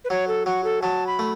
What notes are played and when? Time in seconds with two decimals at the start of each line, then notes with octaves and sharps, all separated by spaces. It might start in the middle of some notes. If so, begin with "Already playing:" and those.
0.05 B4
0.10 F#3 C#5
0.28 A4
0.46 F#3 F#4
0.64 A4
0.82 F#3 A5
1.07 B5
1.19 A3